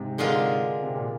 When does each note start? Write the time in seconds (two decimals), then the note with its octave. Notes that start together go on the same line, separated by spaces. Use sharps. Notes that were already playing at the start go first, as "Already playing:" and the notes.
Already playing: G#2 C3
0.18 D3 G#3 D4 F4 A#4
0.83 C3
0.94 A#2